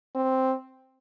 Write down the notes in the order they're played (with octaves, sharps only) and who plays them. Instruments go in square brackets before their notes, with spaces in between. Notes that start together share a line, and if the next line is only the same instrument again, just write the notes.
[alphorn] C4